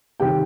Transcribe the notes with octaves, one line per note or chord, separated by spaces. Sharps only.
C3 D#3 G4 G5